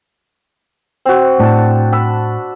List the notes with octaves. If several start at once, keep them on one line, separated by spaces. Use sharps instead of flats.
C4 F#4
A2 D4 A5
B5 E6